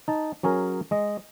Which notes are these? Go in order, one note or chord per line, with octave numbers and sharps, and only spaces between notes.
D#4 A5
F#3 C#4 G#4 A#4
G#3 D#5